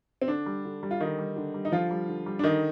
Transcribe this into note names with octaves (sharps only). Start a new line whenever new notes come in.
C4
D3 D4
G3
D3
G3
F4
D3 D#3 D#4
G3
D3
G3
D#4
D3 F3 F4
G3
D3
G3
D4
D3 D#3 D#4